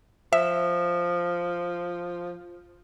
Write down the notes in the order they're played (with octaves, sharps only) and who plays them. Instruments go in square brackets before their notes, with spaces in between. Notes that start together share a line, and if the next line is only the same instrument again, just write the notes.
[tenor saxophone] F3 [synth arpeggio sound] E5